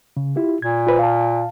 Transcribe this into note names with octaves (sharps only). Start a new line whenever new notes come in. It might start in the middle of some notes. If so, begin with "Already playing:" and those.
C#3
E4 F4 G4
A#2 G#6
F4 B4 C5
F5 A5